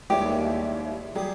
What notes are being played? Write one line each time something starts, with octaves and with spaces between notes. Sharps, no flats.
D#2 E3 G3 G#3 B3 E4 G4 C#5
F#3 G3 G4 G#4 D#6